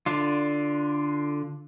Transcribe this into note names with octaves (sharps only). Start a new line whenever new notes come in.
D3 D4 F4